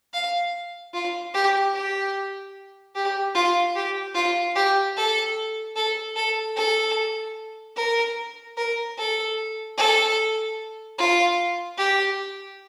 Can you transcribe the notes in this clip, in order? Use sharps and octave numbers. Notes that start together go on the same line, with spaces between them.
F5
F4
G4
G4
G4
F4
G4
F4
G4
A4
A4
A4
A4
A#4
A#4
A4
A4
F4
G4